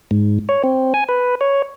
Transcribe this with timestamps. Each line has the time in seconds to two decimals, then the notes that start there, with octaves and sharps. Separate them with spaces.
0.11 G#2
0.49 C#5
0.63 C4
0.94 G#5
1.09 B4
1.41 C#5